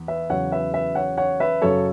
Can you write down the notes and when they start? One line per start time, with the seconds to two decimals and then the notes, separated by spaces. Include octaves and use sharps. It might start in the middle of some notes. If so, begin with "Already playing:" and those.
Already playing: E2
0.08 B4 E5
0.30 E2 C#3 F#3 C#5 F#5
0.52 B4 E5
0.74 B4 E5
0.95 C#5 F#5
1.18 C#5 F#5
1.40 B4 E5
1.62 F#2 C#3 F#3 A4 C#5